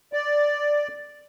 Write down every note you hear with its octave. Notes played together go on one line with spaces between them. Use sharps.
D5